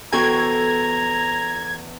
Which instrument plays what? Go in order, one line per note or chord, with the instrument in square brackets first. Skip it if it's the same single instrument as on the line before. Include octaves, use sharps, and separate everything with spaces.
[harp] E2 C5 G5 [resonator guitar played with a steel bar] F#4 A4 G#5 [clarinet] A#5 [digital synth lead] G#6